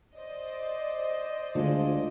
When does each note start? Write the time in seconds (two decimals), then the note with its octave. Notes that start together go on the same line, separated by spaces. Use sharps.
0.15 C5 D5 D#5
1.55 D2 D3 G#3 F4